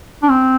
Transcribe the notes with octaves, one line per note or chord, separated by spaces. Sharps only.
D4
C4